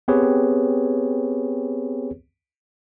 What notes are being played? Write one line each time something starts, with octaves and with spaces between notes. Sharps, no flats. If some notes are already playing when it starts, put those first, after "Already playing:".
B3 C4 G4 G#4 B4 C#5